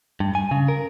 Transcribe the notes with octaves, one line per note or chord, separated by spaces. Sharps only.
G2
G#5
C#3
A#4